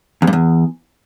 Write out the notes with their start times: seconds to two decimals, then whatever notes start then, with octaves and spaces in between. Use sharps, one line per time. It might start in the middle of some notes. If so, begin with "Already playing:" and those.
0.22 E2
0.27 G2
0.33 E2